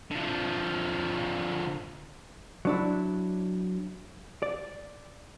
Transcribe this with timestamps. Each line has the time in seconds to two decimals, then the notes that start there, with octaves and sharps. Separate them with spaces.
0.11 D3 F3
2.65 F#3 D4 E4
4.42 D5